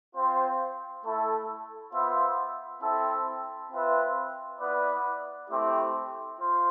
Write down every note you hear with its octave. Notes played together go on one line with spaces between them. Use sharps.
C4 F4 C5
A3 E4 A4
B3 F4 C5 E5
C4 E4 A4 E5
C4 F4 B4 E5
B3 E4 B4 D5
A3 C4 E4 G4
F4 C5